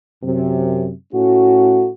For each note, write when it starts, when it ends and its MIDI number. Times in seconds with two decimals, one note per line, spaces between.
0.24 0.91 42
0.24 0.91 48
1.13 1.90 45
1.13 1.90 57
1.13 1.90 61
1.13 1.90 66